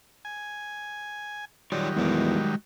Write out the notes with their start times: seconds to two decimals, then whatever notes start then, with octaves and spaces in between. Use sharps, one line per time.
0.25 G#5
1.72 D#3 F#3 G3 F4 C#5 D5
1.97 E2 G#3 F#4 A#4